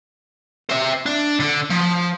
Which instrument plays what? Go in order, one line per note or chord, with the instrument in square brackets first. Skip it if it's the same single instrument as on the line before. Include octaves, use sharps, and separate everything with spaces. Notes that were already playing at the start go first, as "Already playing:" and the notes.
[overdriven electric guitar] C5 E5
D4
D3
F3